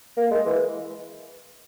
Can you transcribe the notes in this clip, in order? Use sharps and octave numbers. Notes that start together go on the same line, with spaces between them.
A#3
G#3
E3